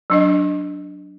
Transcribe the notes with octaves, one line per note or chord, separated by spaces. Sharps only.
F#3 D4 D#5